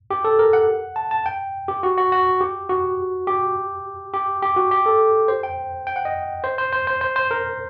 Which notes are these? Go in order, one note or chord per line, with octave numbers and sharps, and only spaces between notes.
G4
A4
A#4
F#5
A5
A5
G5
G4
F#4
F#4
F#4
G4
F#4
G4
G4
G4
F#4
G4
A4
C5
G5
G5
F#5
D#5
C5
C5
C5
C5
C5
C5
A#4